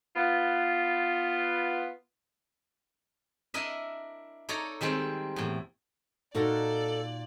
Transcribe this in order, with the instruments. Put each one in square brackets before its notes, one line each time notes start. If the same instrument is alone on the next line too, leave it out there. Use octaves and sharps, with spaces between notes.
[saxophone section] B3 F4
[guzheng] D4 E4 A#4 D#5 E5
D#4 A4 C#5 D5 A#5
D#3 G3 G#3 C4
E2 A2
[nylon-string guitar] A#2 [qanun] D#4 F#4 A#4 [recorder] A4 [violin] D5